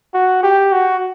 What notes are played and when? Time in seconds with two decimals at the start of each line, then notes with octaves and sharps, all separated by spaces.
0.14 F#4
0.43 G4
0.72 F#4